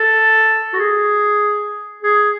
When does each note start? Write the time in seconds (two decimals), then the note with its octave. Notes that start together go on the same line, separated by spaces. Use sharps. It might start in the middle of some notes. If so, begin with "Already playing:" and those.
Already playing: A4
0.73 F#4
0.78 G#4
2.03 G#4